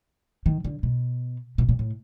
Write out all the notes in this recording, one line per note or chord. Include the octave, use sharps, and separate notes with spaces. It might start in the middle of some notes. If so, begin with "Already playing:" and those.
D#3
D3
B2
B2
A#2
A2